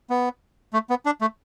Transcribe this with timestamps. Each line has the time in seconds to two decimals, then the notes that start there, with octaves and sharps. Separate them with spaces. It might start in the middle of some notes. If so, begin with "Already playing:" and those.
0.10 B3
0.73 A3
0.90 B3
1.06 D4
1.21 A3